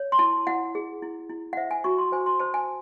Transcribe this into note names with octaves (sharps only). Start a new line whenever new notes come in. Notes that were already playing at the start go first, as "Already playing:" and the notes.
Already playing: C#5
C6
E4 A5
E4 F#5
G#4
E4
E4
F#5
C5 E5
G#5
F#4 C#6
C6
C5 G#5
C6
C5 A5
G#5